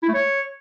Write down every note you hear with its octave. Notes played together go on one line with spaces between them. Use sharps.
E4
A3
C#5